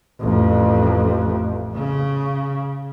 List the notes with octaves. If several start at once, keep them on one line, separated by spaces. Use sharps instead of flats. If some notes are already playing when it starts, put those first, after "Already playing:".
A1 F2
C#3